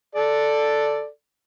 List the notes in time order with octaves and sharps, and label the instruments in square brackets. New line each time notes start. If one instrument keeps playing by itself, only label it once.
[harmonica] A4 D5